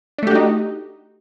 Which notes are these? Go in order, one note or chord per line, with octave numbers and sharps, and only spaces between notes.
A3 D4 D#4 F#4 G4